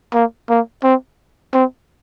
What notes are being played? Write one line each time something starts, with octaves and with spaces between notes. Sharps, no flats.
A#3
A#3
C4
C4